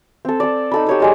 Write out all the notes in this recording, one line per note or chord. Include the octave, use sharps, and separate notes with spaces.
C4 A4
A4 D5
D#4 A4 B5
G4 C#5 D#6
G3 G#3 C#5